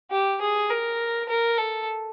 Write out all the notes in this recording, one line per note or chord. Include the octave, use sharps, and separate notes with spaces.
G4
G#4
A#4
A#4
A4